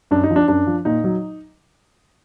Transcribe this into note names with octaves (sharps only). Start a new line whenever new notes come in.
F#2 D4
D#4
F3
D4
F#2 D4
F3
A#2 D#4
F#3